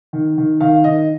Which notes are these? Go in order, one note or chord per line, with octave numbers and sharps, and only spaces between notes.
D#3
D#3
D#3 F5
D#3 D#5